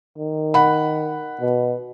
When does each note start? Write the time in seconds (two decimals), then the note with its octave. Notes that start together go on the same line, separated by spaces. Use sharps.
0.18 D#3
0.54 F#5 B5
1.41 B2